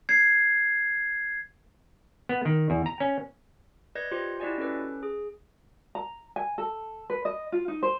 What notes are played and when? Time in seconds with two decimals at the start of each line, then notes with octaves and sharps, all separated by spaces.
0.09 G#6 C7
2.29 B3
2.45 D#3
2.70 E2
2.86 A#5
3.00 C#4
3.95 B4 D5 D#5 G6 G#6 A#6
4.11 F4 G4 C5 G6 C#7
4.40 E4 F#4 G4 D5 D#5 G#5
4.58 C#4 A4 B4
5.03 G#4
5.95 A#5
6.36 G#5
6.58 A4
7.10 B4
7.25 D#5
7.52 F4
7.68 D#4
7.83 C5